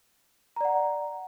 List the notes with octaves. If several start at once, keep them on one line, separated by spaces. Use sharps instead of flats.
D5 F#5 A#5